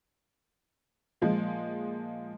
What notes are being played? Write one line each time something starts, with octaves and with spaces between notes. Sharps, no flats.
A#2 F3 G#3